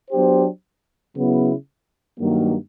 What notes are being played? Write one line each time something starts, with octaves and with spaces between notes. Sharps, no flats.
F#3 B3 D4 G4 C5
C#3 F#3 B3 E4
G2 D#3 F#3 A#3